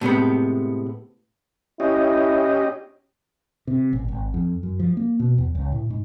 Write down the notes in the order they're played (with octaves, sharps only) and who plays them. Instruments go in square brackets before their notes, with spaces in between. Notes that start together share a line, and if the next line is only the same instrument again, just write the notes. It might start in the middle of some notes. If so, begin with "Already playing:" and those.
[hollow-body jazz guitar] A2 C3 G#3 B3
[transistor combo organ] C#4 G4 D#5 [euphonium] E4
[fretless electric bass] C3
A1
G#1
F2
F#2
F3
A#3
B2
E2
C#2
A2
G#2